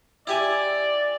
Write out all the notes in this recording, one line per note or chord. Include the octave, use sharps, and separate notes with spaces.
E4 G4 D5 G#5